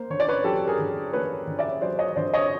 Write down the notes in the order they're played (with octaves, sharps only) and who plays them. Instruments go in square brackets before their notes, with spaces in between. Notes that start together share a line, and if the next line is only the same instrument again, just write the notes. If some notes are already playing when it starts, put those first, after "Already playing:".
Already playing: [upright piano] A#3 C5
D3 C#5
D5
B4 C#5
F#3 G4 A4
G#4 A#4
D3
A#3 B4 C#5
D3
D5 E5
F#3 C5 D5
C#5 D#5
D3 C5 D5
C#5 D#5